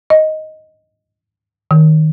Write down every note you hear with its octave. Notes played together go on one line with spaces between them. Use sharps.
D#5
D#3